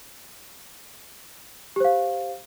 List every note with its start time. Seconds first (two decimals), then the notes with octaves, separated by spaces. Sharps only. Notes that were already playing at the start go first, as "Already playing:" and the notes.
1.76 G4
1.80 C5
1.85 F5